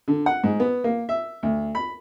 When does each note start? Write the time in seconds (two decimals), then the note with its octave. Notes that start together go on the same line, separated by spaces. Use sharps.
0.08 D3
0.26 F#5
0.44 G#2
0.60 B3
0.84 A#3
1.09 E5
1.43 D2
1.75 B5